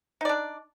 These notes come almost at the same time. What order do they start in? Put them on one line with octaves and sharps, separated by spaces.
D#4 D5 D4